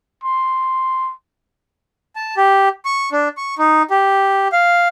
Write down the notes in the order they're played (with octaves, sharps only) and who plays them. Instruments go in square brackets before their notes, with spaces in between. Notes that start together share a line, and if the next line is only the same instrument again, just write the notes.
[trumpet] C6
[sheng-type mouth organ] A5
G4
C#6
D4
C#6
D#4
G4
F5